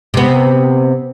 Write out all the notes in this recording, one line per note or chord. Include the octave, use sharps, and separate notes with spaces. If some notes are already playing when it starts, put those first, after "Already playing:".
C3 B3